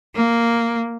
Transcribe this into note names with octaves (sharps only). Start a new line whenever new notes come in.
A#3